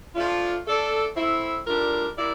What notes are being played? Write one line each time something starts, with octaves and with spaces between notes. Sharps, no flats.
F3 A3 D4 F4
A3 D4 A4 D5
A3 C4 E4
A2 G3 D4 F4 A#4
G3 A#3 E4 G4 D5